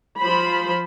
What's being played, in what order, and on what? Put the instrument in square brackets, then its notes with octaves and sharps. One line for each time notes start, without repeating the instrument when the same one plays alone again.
[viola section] F3 C5 B5